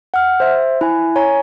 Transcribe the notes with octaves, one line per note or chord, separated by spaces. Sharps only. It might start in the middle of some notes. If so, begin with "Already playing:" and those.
F#5 F6
C5 E5
E4 G#5
C#5 G#5 A#5